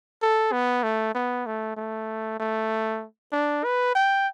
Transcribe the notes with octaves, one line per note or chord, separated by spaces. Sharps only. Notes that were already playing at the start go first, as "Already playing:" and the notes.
A4
B3
A3
B3
A3
A3
A3
D4
B4
G5